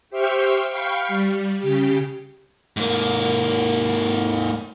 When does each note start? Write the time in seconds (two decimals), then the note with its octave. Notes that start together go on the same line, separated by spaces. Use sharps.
0.10 G4 C5 E5 G5 C#6 F6
0.70 F5 G5 B5 C#6 F6
1.08 G3
1.59 C#3 G4
2.77 G#2 A#3